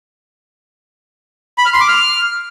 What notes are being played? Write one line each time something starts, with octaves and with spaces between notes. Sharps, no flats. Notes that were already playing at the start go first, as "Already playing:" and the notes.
B5
F6
C6
D6
F6